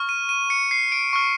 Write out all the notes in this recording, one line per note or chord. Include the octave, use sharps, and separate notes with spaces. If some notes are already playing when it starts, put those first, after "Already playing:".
Already playing: C#6 F6
D#7
D#7
C#7
C7
D7
C#6 F6